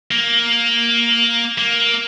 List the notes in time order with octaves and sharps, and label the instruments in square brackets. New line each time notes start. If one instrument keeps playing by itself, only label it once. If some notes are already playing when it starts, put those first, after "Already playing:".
[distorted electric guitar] A#3
A#3